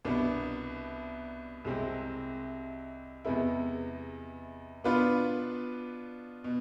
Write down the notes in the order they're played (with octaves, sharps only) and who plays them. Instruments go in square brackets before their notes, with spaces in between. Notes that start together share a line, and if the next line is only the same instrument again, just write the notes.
[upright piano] C2 B2 B3 D4
C2 C3 G#3 C4
E2 C3 G#3 B3 E4
B2 B3 D4 F4 B4
B2